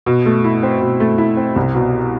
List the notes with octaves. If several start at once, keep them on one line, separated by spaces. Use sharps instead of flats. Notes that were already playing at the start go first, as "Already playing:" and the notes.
B2
A3
E4
C4
B2
A3
E4
C4
C2
B2